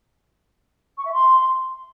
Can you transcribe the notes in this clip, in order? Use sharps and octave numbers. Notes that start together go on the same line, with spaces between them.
C#6
E5
C6